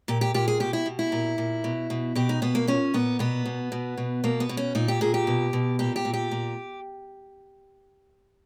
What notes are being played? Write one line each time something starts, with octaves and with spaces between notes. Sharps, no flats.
A#2 G4
G4
A#2 G4
G#4
B2 G4
E4
B2
E4
A#2
A#2
B2
B2
B2 G4
D#4
B2 B3
A#3
A#2 C#4
A#2 B3
B2 B3
B2
B2
B2
B2 A#3
B3
B2
C#4
A#2 D#4
G4
A#2 G#4
G4
B2
B2
A#2 G4
G4
A#2
G4
A#2